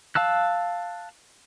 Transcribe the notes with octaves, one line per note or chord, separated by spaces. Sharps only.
F5 A5 E6 F#6